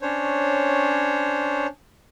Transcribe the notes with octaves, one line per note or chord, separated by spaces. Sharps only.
C#4 D4 C5 C#5